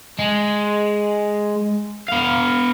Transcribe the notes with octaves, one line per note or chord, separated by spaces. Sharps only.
G#3
B3 F5